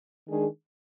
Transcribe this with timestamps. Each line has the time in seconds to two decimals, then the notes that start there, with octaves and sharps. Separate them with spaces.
0.28 D#3 G#3 D4 G#4